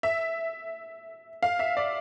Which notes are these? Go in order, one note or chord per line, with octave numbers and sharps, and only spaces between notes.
E5
F5
E5
D5